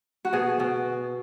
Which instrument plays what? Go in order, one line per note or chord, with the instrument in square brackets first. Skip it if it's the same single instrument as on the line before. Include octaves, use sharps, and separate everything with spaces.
[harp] F#4
B2 G#4
B2